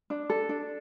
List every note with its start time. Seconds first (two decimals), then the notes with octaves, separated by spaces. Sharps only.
0.10 D4
0.30 A4
0.49 D4